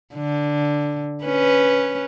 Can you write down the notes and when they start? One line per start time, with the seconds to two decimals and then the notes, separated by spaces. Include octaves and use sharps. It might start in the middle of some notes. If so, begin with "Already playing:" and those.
0.15 D3
1.24 C#4 B4